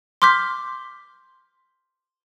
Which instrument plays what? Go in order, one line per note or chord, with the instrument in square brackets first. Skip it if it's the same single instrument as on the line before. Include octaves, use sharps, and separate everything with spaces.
[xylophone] C6 D6 F6 G6 B6